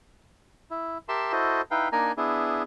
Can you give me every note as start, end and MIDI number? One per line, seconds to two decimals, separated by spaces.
0.71 0.98 64
1.09 1.32 67
1.09 1.32 70
1.09 1.32 76
1.09 1.32 81
1.09 1.32 84
1.33 1.61 64
1.33 1.61 66
1.33 1.61 69
1.33 1.61 72
1.33 1.61 75
1.71 1.88 63
1.71 1.88 64
1.71 1.88 71
1.71 1.88 77
1.71 1.88 79
1.92 2.12 58
1.92 2.12 62
1.92 2.12 63
1.92 2.12 70
1.92 2.12 80
1.92 2.12 82
2.17 2.63 59
2.17 2.63 62
2.17 2.63 64
2.17 2.63 68